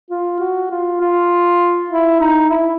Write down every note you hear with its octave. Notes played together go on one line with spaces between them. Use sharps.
F4
F#4
F4
F4
E4
D#4
E4